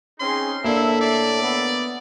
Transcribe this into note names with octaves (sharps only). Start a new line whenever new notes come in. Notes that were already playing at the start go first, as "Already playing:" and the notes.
C4 C#4 D#4 G#4 C6
A2 A#3 D4 E4 A4 E5
D5
B3